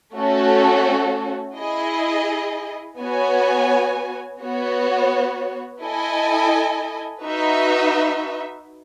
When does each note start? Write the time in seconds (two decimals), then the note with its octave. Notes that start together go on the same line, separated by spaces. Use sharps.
0.17 A3 C#4 F#4 A4
1.58 E4 G#4 D#5
2.99 B3 F#4 C#5 G#5
4.41 B3 F#4 C#5
5.82 E4 A4 D#5 G#5
7.23 D#4 F#4 B4 E5